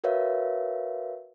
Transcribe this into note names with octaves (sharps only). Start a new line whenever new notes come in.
F#4 A#4 B4 C#5 E5 F5